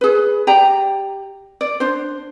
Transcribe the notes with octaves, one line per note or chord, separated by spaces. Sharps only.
G#4 B4
G4 D5 G5 A#5
D5
D4 C5